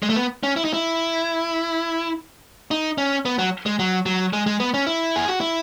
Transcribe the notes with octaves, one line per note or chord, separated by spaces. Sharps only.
G#3
A3
B3
C#4
E4
D#4
E4
D#4
C#4
B3
F#3
G#3
F#3
F#3
G#3
G#3
B3
C#4
E4
G#4
F#4
E4